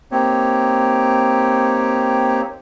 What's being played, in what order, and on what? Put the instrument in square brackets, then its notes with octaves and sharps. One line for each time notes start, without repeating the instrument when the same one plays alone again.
[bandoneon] A#3 C4 D#4 G4 C#5